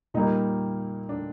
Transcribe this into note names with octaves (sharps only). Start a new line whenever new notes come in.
A#2 G3 A#3 D#4
D4